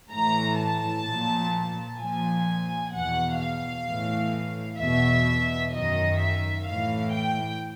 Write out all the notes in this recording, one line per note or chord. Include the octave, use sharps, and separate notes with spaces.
A2 E3 A#5
A5
A#2
F3
A#2 F3 G#5
E2 B2 F#5
F5
A2 E3
E2 B2 E5
F#2 D#3 D#5
E5
A2 E3 F5
G5